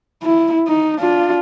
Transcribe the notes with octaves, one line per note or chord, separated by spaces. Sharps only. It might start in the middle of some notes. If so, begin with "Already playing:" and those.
E4
D#4
D4 F4